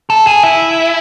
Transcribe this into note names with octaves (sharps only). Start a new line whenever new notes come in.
A4
G#4
E4